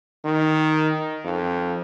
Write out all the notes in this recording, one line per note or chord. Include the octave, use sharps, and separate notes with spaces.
D#3
F2